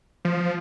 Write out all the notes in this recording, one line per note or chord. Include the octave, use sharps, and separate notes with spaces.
F3